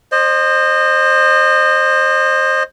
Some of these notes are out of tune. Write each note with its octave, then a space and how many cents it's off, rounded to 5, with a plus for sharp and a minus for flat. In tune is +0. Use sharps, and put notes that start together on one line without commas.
C5 +20 D#5 -25